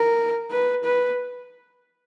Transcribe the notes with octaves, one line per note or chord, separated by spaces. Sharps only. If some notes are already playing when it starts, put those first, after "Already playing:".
Already playing: A#4
B4
B4